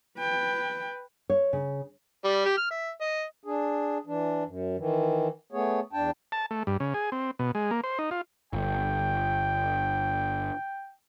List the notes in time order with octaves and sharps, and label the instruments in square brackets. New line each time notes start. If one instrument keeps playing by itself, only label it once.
[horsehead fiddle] B4 G5
[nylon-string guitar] C#5
C#3
[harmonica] G3 D5
G4
F6
E5
D#5
[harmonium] D4 G#4
E3 D4
F#2
D#3 E3
A3 B3 G#4 C#5
E2 D4 G5 A5
[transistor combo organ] A5
A3
G2
C#3
G#4
C4
B2
G#3
A#3
C5
D#4
F4
[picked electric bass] G1 [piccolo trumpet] G5